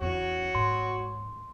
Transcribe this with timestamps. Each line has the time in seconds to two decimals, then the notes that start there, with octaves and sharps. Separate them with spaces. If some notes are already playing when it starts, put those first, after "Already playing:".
0.01 E2 C#4 F#4 C#5
0.55 G#2 C6